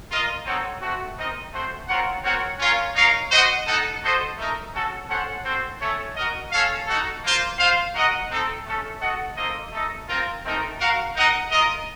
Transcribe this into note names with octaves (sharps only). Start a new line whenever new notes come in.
F4 A#4 D#5
C4 D#4 A4 C#5 F#5
A3 C4 F#4
C4 D#4 A#4 D#5
A3 C4 F#4 C5
C4 F4 A#4 C#5 F#5
C4 F#4 A#4 C#5 F#5
C#4 F4 A#4 C#5 F5
D#4 A#4 C#5 F5
F#4 C5 D#5 F#5
D#4 A4 D#5 F#5
F#4 A4 C5 D#5
A3 D#4 A#4
C#4 F#4 A4
C#4 A4 C5 F#5
C4 F#4 A4 C5
A3 C#4 A4 C#5
F#4 A#4 D#5
C#4 A4 C#5 F5
D#4 F#4 A4
A#3 F4 C5
F4 C5 F5
F#4 A#4 D#5 F#5
C4 D#4 A4
A3 C#4 A4
F#4 A4 D#5 F#5
A#3 D#4 A4 C5 D#5
A3 D#4 A4 D#5
C4 F4 A#4
A3 C4 D#4 A#4
F#4 A#4 F5
D#4 A#4 D#5 F#5
F4 A#4 D#5